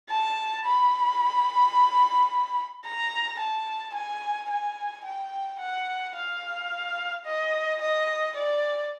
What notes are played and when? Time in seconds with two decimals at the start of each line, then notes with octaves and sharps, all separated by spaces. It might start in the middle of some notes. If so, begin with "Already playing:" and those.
0.10 A5
0.65 B5
2.85 A#5
3.40 A5
3.94 G#5
4.50 G#5
5.05 G5
5.60 F#5
6.15 F5
7.25 D#5
7.81 D#5
8.35 D5